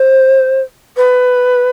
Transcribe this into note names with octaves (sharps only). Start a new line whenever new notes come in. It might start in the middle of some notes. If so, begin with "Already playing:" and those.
Already playing: C5
B4